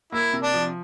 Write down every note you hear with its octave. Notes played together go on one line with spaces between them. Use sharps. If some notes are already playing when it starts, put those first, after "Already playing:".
A#3 E4
C3
D4
F3